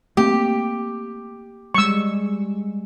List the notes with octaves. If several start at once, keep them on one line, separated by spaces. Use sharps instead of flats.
A3 A#3 C4 G4
G3 G#3 C#6 E6